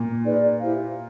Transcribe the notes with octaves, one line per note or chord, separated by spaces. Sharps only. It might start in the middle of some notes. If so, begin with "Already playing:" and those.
Already playing: A#2
D#4 G#4 B4 D5
E4 G4 C5 F5